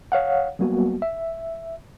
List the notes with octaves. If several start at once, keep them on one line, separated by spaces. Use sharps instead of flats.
C#5 F5 F#5
F#3 G3 A#3 B3 F#4
E5